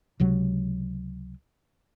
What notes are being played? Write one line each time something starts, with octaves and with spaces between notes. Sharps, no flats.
C#2 C3 F#3